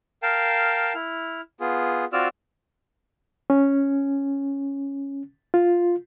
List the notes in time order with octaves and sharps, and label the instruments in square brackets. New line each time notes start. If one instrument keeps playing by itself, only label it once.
[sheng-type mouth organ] A#4 F5 G5 A5
E4 F6
B3 F4 G#4
C4 F4 F#4 D5 E6 F6
[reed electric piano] C#4
F4